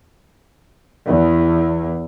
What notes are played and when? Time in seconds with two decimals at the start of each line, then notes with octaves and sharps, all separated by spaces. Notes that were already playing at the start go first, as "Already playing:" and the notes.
1.08 E2